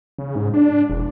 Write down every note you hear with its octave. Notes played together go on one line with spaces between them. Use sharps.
C#3
G#2
D4
E1